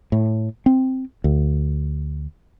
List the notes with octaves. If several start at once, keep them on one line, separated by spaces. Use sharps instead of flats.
A2
C4
D2